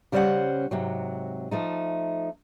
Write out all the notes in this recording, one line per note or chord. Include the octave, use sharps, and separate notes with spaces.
C#3 G3 C#4 C5 E5 F#5
G#2 C3 F#3
F3 A3 D#4